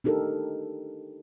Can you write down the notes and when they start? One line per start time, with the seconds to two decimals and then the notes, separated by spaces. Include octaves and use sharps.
0.04 D4 D#4 G4 A4 A#4